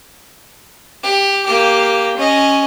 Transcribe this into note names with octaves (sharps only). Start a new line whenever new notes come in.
G4
A#3 G4
C#4 D#5